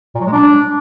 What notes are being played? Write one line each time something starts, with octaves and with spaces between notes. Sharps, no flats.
A#2
F#3
G#3
D4